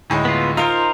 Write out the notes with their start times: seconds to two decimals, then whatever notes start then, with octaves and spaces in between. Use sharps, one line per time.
0.10 D2 A2 G#3
0.25 B3 F4
0.57 D#4 F4 A#4 C5